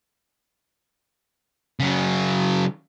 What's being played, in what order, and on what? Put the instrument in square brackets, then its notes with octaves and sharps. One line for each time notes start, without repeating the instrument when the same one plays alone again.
[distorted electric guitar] C#3 F#3